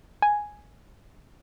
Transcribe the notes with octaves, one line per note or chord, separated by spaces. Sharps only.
G#5